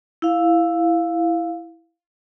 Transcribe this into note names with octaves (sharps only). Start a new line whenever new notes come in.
E4 F5